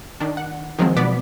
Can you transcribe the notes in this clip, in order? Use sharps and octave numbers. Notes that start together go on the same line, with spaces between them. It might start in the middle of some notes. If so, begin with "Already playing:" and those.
D#3 D4
F#5
D#3 F3 F#3 G#3 C4
B2 B3 D5 D6 B6